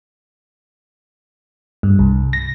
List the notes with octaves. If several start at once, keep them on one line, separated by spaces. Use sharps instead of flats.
G2
C2
A#6